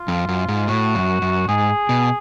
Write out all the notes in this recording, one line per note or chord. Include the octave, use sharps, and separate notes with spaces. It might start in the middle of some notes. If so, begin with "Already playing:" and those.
Already playing: F4
F2
F#2
G#2
A2 F#4
F#2
F#2
G#2 G#4
B2